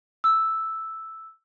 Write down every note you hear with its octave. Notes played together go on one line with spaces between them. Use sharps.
E6